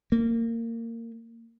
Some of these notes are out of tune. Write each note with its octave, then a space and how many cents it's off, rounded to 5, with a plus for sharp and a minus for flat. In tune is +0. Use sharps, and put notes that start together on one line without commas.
A#3 -20